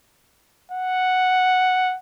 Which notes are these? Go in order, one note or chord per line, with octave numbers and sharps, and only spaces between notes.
F#5